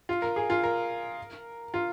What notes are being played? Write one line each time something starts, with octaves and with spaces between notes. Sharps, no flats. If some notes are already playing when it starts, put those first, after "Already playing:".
F4
A#4
G#4
F4
A#4
F4